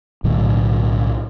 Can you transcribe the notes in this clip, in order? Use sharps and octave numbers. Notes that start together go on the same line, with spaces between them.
B1 A2 D3 F#3